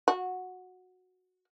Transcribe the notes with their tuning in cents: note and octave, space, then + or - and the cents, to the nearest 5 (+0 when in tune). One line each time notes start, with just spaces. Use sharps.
F#4 -10